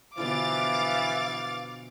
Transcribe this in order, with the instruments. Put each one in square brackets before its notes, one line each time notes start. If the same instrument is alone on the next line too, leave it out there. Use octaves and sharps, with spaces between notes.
[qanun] B2 D3 F3 [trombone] E3 [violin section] F5 D6 A6